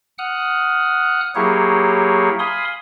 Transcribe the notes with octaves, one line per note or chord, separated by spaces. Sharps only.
F#5 D#6 F6 F#6
F#3 A#3 E4 G4 G#4 C#5
F5 G#5 B5 C6 D#6